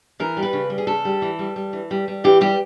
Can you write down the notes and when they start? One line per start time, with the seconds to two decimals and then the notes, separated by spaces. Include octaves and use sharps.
0.20 E3 A#4
0.37 G3
0.43 B4
0.53 C#3
0.70 G3
0.78 G#4
0.87 C#3 A4
1.05 G3
1.22 E3
1.39 G3
1.56 G3
1.73 E3
1.91 G3
2.08 G3
2.24 E3 G4
2.41 G3 G4